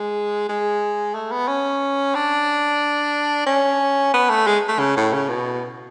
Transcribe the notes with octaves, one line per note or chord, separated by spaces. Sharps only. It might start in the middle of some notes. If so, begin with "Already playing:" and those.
Already playing: G#3
G#3
A3
B3
C#4
D4
C#4
B3
A3
G#3
A3
C#3
A2
C#3
B2